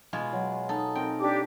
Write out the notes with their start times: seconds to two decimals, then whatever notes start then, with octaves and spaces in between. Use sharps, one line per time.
0.13 B2 G#3 F4 G#5
0.33 F#3
0.69 D#4 A4
0.95 C4 A#4 G5
1.20 D4 G4 D6